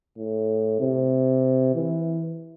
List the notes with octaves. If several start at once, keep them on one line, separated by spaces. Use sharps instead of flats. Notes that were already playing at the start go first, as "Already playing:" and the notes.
A2
C3
E3